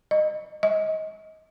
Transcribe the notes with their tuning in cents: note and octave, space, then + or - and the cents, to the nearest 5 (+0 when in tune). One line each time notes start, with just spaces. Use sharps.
D#5 -25
D#5 +30